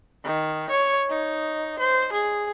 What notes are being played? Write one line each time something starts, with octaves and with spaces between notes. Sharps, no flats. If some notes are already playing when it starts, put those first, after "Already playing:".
D#3
C#5
D#4
C5
G#4